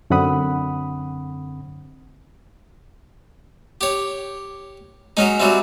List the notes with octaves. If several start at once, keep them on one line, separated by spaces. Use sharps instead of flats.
F#2 D3 C4 F#5 B5 D#6
G4 C#5
F#3 G#3 C#4 D#4
F#3 G3 C4 F#4 E5